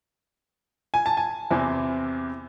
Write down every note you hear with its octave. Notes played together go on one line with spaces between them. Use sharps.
G#5
A5
G#5
E2 C3 E3 C4 E4